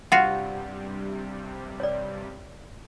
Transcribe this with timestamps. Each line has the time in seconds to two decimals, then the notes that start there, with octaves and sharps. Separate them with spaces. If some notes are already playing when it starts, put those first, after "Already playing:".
0.12 G2 C3 G3 F4 F#4 F#5
1.80 C#5 D5